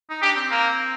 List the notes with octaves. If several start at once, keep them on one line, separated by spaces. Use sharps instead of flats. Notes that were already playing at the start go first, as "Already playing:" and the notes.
D#4
D4 G4
C4
A#3